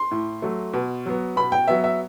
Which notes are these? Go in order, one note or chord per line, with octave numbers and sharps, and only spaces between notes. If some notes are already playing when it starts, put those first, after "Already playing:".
Already playing: C6
A2
F#3 A3
B2
F#3 B3
B2 B5
G5
F#3 B3 E5
E5